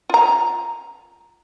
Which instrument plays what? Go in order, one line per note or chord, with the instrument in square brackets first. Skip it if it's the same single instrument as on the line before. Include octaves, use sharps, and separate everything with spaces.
[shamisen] F4 A#5